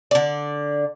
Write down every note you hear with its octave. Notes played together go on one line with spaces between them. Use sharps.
D3 D5